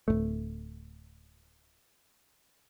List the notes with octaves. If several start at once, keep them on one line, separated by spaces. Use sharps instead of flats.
D1 F2 A3